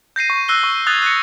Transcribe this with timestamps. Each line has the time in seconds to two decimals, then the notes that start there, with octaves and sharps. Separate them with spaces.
0.16 G6 A#6 C7 D#7
0.30 C#6
0.48 E6 F#6 A#6 C7 G7
0.63 C#6
0.87 D#6 F#6 G#6 A6 F7
1.02 F#6 A#6 C#7